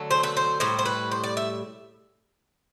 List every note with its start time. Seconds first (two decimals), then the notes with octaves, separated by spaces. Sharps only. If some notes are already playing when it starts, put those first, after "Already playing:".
Already playing: D3 F#3 A3
0.11 C5
0.23 B4
0.37 C5
0.60 A2 G3 C5
0.79 C5
0.86 B4
1.11 C5
1.24 D5
1.37 E5